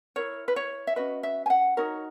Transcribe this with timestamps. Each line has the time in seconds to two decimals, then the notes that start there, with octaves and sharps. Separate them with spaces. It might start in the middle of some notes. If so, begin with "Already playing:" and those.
0.16 E4 A#4 C#5
0.48 B4
0.56 C#5
0.87 E5
0.96 C#4 F#4 B4 D#5
1.23 E5
1.46 G#5
1.50 F#5
1.77 D#4 F#4 A#4 C#5